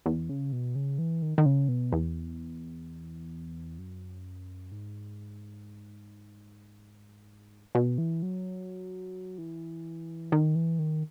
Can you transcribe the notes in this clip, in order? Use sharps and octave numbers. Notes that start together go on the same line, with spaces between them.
E2
C#3
B2
C#3
E3
D#3
D#3
C#3
B2
E2
F#2
G#2
B2
E3
F#3
E3
D#3
E3
D#3